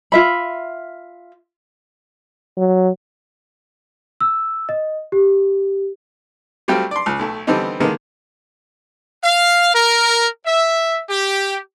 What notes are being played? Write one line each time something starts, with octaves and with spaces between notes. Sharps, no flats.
F4 E5 B5
F#3
E6
D#5
G4
F#3 G3 A3 C4 F4 G5
D5 C6
C#2
B1 A3
D3 E3 G3 B3 C4 D#4
D3 D#3 G#3 A#3 B3 D#4
F5
A#4
E5
G4